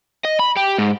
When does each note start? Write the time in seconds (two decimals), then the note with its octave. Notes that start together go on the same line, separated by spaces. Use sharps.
0.25 D#5
0.40 B5
0.57 G4
0.78 G#2